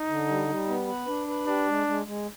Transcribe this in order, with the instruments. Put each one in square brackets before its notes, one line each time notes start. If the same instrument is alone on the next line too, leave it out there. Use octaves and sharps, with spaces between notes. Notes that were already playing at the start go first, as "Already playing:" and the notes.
Already playing: [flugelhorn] D#4
[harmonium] D3
G3
G3
B3
B4
D4
B4
[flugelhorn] D4 [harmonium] G4
[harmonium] G#3
G#3
G#3